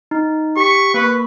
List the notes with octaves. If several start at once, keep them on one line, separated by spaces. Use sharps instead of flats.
D#4
G4 C#6 B6
A#3 B4 C#6